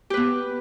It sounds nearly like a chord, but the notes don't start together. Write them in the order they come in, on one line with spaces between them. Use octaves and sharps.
G4 B4 B3